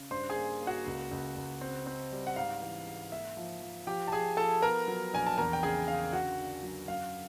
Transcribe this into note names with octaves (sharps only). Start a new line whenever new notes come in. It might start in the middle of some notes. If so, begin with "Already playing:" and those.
Already playing: C#3
G2 C5 C6
G#4 G#5
A#3
A#3
F#4 F#5
C#2
C#2
C#2
C4
C4
G3
F#5
G#2 F5
E3
G#2
A#3 E5
F3
F3
F3 G4 G5
A5
F3 G#4 G#5
F3 A4 A5
B3 A#4 A#5
F#3
A#1 G#5
A5
E2 A#4 A#5
G5
C#3 G#4 G#5
C#3 F5
D3 F#4 F#5
D3
F#3
F#2 F5